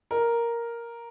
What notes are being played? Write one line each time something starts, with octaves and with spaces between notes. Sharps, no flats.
A#4